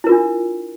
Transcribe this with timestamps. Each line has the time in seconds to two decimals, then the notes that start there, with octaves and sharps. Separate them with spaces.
0.04 E4
0.07 A#4
0.09 F4
0.12 D4